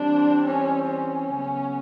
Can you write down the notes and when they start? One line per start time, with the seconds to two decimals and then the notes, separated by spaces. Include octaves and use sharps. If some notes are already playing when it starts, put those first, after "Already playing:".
Already playing: E3 G3 C4 D4
0.45 C#4
0.87 C#4
1.28 C#3 F#3 B3